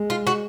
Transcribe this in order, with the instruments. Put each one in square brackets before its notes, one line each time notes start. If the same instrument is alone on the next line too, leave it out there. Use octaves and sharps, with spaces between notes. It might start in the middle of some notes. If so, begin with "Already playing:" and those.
Already playing: [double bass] G#3
[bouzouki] F4
F#4